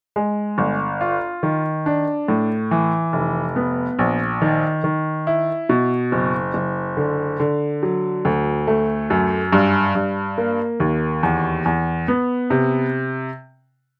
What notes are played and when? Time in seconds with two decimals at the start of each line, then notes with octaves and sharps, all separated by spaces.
0.16 G#3
0.58 G1
1.01 F4
1.43 D#3
1.86 D4
2.28 A2
2.71 E3
3.13 F1
3.56 B3
3.99 A#1
4.42 D#3
4.84 D#3
5.27 E4
5.69 B2
6.12 F#1
6.54 F#1
6.97 D3
7.40 D3
7.83 F#3
8.25 D2
8.67 A3
9.10 F#2
9.53 G2
9.95 G2
10.38 A#3
10.80 D#2
11.23 E2
11.65 E2
12.08 B3
12.50 C3